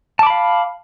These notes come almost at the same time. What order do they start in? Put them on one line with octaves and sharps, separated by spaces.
A5 D6 B5 F5